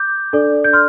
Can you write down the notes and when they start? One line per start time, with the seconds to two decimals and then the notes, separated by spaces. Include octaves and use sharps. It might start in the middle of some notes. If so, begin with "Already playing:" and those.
Already playing: D6 G6
0.33 D4 A4 D5
0.64 G6
0.73 C6 F6